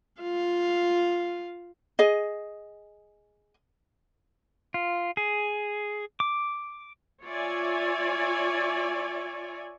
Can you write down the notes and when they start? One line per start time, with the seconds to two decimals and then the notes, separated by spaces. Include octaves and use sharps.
0.21 F4 F5
1.99 G#4 D#5
4.74 F4
5.17 G#4
6.20 D6
7.23 F4 C#5 D5 E5 G#5